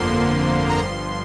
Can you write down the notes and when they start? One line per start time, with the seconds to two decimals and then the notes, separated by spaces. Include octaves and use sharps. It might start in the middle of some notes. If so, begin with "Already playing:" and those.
Already playing: G1 F2 D3 F3 A#3 C6
0.12 C6
0.70 A#5
0.79 G1 G2 F3 C6